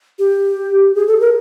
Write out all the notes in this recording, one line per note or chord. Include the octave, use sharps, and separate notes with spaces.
G4
G#4
A4
A#4